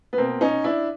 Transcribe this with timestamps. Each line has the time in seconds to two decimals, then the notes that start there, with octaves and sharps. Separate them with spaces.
0.13 B3
0.18 B2 A#3 C4
0.41 C#4 D#4
0.64 D4 E4